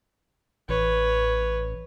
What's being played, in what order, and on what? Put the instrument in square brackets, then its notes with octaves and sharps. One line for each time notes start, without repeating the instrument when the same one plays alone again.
[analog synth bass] A1 [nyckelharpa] B4 C#5